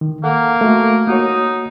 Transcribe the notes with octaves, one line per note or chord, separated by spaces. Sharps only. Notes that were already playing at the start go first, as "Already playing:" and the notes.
D#3
A#3 A4 F#5
A3 F#4
A#3 D#4 F#4 C#5